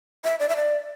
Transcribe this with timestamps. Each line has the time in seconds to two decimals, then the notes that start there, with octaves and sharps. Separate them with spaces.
0.24 E5
0.40 D5
0.49 E5
0.56 D5